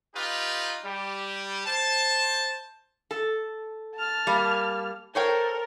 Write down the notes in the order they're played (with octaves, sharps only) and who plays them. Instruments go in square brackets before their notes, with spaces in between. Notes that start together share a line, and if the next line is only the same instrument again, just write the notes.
[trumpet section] D#4 F4 G4 B4
G3 G4
C5 A5
[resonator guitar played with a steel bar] A4
[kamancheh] A5 F6
[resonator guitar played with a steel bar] G3 A#3
[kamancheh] A4 A#4 [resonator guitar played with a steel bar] C5 C#5 G5